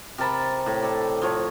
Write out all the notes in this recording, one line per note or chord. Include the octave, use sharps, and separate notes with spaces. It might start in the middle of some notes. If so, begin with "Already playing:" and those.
C3 A#4 A5 B5
A2
A4 D5
F3 C#5